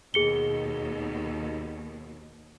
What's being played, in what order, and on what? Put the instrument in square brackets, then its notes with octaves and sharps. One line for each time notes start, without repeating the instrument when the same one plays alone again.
[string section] D#2 B2 [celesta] G#4 C#7 G7